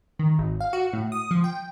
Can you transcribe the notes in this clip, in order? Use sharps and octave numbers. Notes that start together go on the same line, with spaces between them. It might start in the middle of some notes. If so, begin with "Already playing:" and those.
D#3
G#1
F5
F#4
A2
D#6
F3
G5